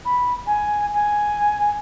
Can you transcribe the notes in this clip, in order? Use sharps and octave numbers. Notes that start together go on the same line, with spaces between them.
B5
G#5
G#5